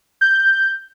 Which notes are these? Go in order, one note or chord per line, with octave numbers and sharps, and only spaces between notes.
G6